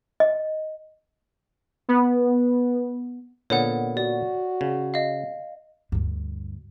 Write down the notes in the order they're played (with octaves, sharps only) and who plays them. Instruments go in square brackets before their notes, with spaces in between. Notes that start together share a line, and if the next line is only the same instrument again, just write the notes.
[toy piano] D#5
[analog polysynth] B3
[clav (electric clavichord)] A#2 D3 B3 [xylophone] C#5 F#5
[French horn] F#4 [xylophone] D5
[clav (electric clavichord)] C#3
[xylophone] D#5 F5
[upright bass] D2 G2